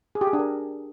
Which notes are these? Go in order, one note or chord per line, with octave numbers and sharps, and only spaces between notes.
G#4
G4
G#4
D4
A#4